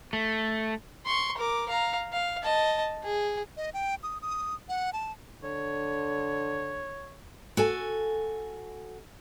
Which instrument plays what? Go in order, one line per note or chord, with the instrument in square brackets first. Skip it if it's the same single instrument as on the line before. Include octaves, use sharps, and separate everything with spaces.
[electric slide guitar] A3
[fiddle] C6 C#6
A#4 D6
F5 A#5
F5
D#5 A5
G#4
[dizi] D#5
G5
D#6
D#6
F#5
A5
[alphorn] D3 [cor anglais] C#5
[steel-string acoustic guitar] F#4 A4 G#5